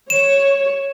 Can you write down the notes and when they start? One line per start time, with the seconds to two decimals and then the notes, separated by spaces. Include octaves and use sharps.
0.10 C#5 E7